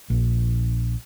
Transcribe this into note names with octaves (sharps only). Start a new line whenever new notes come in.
A#1